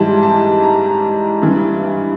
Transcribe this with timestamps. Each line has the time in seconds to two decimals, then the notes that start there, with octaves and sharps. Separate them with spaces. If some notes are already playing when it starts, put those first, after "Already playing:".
Already playing: G#2 E3 G3 A5
0.23 A5
0.63 A#5
1.42 G2 E3 G3